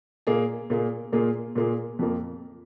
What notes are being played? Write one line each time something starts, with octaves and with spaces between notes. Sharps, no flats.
A#2 A#3 G#4
A#2 A#3 G#4
A#2 A#3 F4 G#4
A#2 A#3 F4 G#4
F2 F3 A#3